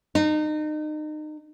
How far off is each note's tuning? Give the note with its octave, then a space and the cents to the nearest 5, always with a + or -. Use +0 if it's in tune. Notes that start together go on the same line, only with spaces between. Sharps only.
D#4 -30